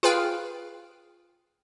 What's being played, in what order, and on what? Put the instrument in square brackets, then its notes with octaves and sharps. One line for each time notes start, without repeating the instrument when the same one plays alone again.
[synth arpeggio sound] F4 G#4 B4 F5 G5 F6